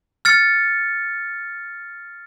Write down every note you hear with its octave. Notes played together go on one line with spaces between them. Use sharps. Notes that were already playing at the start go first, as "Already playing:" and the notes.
F6 A6 C#7